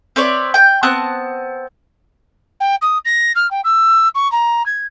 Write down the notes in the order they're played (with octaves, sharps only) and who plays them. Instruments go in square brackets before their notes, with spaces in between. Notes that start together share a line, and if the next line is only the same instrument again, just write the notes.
[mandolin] C4 B4 C#5 D5
G5 G6
B3 C4 A5 F#6
[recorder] G5
D#6
A#6
F6
G5
E6
C#6
A#5
G#6